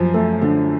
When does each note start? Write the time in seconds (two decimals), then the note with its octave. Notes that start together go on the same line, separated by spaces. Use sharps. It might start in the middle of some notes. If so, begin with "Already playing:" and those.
Already playing: F#2 F3
0.14 A3
0.41 D3